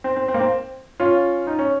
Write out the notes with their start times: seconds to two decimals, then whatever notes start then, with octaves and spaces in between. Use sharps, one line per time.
0.04 C4
0.17 C4
0.28 C4
0.34 A#3
0.40 C4
1.00 C#4 F4
1.47 D#4
1.59 C#4